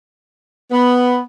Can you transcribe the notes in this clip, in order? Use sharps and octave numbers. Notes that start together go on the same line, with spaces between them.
B3